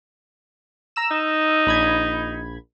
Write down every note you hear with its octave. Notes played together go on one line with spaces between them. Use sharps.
A#5 E6 E7
D#4
A#1 B5 G#6